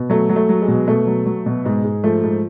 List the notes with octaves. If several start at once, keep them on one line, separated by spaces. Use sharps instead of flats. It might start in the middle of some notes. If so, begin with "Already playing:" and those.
Already playing: B2
F#3 A3
F#3
A3
F#3
G#3
B2
B2 A3
F#3
F#3
B2
G#2 G#3
G#2
F3 A3
G#2